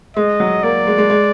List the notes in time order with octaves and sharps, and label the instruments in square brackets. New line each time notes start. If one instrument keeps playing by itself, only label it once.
[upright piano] G#3 [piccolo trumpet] D#5
[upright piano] F#3
[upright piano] A#3 [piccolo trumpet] D5
[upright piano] G#3
G#3
G#3